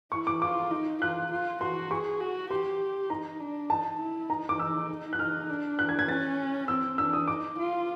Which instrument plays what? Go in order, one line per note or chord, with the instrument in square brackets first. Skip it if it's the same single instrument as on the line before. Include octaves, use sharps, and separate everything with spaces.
[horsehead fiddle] E4 [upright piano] C#6
[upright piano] D6
[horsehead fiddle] F4 [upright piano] D6
[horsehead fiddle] D#4
[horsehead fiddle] F4 [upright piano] F#6
[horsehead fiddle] F4
[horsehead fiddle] F#4 [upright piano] C6
[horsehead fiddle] G#4 [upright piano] C#6
[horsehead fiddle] F#4
[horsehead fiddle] G4 [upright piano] C6
[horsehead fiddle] D#4 [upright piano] A#5
[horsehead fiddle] D4
[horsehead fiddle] D#4 [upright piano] A5
[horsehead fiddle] E4
[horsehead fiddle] D#4 [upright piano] A#5
[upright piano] D6
E6
F#6
[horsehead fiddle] D#4 [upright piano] F6
[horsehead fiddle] D4
[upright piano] F#6
G#6
G#6
[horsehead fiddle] C#4 [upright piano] A6
[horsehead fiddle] C4 [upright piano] E6
[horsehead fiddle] D4 [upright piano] E6
[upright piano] D#6
[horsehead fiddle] D#4 [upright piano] D6
[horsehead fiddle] F4